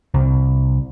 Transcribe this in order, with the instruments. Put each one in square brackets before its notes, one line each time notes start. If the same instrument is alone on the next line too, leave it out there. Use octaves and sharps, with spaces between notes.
[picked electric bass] C2